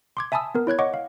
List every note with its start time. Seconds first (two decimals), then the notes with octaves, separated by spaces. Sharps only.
0.17 C6 D6 G#6
0.32 E5 G#5 A5 B5 D#6 E6
0.55 B3 A#4
0.67 E4 C#5 F#6 G#6
0.79 C#5 D#5 F#5 C#6 D6
0.94 F5